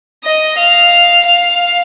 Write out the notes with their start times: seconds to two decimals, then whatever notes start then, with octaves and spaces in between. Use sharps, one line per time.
0.25 D#5
0.58 F5
1.26 F5